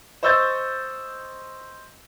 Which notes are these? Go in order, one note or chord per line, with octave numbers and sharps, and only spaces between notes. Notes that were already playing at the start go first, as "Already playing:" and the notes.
C5 D#5 C#6 E6 G6 A6